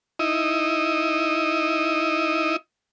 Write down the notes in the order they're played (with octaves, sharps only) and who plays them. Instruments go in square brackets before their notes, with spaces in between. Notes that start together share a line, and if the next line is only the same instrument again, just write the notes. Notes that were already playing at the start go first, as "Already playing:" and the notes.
[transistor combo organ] D#4 E4 D#5